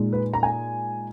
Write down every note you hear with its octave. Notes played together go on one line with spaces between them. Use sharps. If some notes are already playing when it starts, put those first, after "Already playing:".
Already playing: A#2 G#3 D#4
B4
A#5
G#5